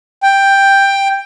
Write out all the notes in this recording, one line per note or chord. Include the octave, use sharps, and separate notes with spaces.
G5